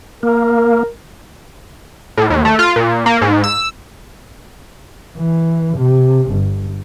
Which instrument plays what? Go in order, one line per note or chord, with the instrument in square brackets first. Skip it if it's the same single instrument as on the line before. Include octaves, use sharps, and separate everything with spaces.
[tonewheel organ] A#3 [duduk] A#4
[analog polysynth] A2
D#2
A3
F4
A#2
A#3
G#2
E6
[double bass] E3
C3
G1